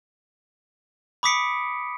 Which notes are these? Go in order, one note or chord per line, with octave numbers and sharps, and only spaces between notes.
B5 D6 D#6 B6 C#7 D7